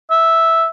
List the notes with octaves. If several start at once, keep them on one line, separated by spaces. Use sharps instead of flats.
E5